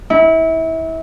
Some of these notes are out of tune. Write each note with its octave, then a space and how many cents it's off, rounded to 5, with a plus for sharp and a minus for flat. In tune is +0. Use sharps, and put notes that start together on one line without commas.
E4 -30